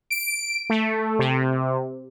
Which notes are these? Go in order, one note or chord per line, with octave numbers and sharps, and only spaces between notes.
D7
A3
C3